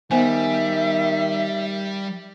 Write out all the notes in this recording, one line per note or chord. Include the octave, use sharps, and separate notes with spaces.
D#3 G3 B3 C5 E5 G#5